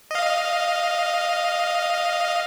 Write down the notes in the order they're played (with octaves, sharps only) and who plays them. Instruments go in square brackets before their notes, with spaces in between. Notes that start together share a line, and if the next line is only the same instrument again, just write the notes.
[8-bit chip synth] D#5 F5